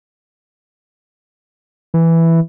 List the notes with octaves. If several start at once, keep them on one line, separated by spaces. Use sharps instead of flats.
E3